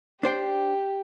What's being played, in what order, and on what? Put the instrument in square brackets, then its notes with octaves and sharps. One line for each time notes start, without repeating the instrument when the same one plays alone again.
[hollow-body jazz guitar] D4 C5 G5 [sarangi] G4